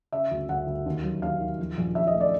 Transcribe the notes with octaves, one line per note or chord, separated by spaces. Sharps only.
C#3 E5
D2
D2 F#5
D2
D#2
F#3
D#2 F5
D#3
F3
A#1
F3 E5
D#5
A3
D5